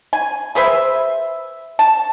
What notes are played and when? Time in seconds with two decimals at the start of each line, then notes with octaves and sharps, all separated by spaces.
0.13 G#5
0.55 G#4 B4 C5 E5
1.79 A5